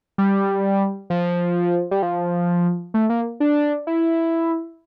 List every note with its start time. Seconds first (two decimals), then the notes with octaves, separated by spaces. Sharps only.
0.18 G3
1.10 F3
1.91 G3
2.02 F3
2.94 A3
3.10 A#3
3.40 D4
3.87 E4